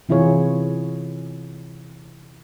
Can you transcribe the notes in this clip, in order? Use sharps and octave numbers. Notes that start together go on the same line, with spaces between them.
C3 E3 E4 F4 G#4 C#5